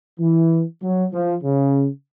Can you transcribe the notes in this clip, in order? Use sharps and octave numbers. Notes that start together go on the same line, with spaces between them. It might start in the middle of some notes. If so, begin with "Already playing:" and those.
E3
F#3
F3
C#3